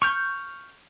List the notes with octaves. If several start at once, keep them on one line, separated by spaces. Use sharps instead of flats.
C#6 F6 G6